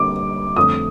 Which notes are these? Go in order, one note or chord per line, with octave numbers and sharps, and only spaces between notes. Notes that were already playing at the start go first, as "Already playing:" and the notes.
Already playing: D3 G3 A#3 D6
F2 D3 A3 D#6